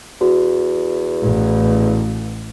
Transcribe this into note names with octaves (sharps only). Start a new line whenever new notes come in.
E2 F#4
A1